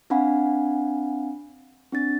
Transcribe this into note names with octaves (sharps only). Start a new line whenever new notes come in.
C4 D4 F5 F#5 G#5 B5
C4 D4 A6